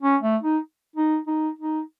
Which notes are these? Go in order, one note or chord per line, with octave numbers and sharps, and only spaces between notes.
C#4
A3
D#4
D#4
D#4
D#4